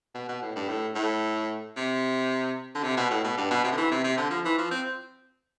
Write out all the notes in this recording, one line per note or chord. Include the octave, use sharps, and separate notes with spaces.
B2
B2
A2
G2
A2
A2
C3
D3
C3
B2
A2
B2
G2
B2
C3
D3
E3
C3
C3
D3
F3
E3
F3
C4